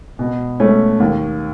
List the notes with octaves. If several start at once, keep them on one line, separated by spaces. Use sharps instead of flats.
B2
A3 C#4
D#2